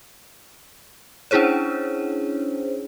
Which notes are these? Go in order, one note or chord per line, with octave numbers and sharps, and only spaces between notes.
C#4 D4 E4 G#4 C5 C#5